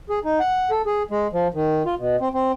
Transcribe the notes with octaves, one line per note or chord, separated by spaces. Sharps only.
G#4
D#4
F#5
A4
G#4
G#3
F3
D#3
F4
B2
C4
C4